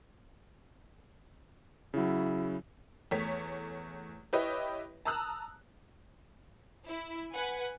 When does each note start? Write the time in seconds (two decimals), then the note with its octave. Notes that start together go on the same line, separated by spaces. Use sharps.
1.94 C#3 F#3 E4
3.11 E2 A3 C#5 B6
4.33 E4 G4 B4 C#5 D#5 E5
5.05 A5 A#5 D#6 E6 F#6
6.87 E4
7.32 B4 F#5 G#5